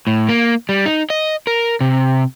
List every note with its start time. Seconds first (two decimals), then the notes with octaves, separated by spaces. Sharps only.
0.07 A2
0.29 A#3
0.69 G3
0.86 D#4
1.10 D#5
1.47 A#4
1.81 C3